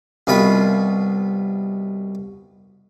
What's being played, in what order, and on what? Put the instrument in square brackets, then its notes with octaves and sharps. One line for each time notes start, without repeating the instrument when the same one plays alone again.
[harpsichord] C2 B2 F4 B5